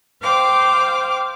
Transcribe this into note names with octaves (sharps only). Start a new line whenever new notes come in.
C5 F5 G5 D6